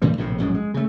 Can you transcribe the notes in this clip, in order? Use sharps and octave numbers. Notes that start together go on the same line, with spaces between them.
A2 D3 E3 G3
A#1 A2 C3
A#1 F#2 A2 G#3
G#3
C#3 A3